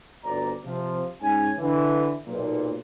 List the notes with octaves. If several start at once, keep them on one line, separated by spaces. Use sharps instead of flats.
G1 D2 D5 A#5
C3 F3
G#2 C#4 G#5
D3 E3
B1 A#2